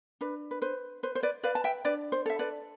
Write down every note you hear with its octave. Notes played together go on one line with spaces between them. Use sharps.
D4 B4
B4
B4 C5
B4 C5
C5
B4 D5
B4 D5 F5
A5
E5 G5
D4 B4 D5
C5
A4 E5
B4 D5